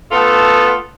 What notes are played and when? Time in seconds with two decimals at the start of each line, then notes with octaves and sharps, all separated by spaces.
0.12 A3 B3 F4 A4